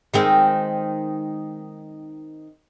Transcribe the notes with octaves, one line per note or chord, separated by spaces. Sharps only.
D#3 G#3 C4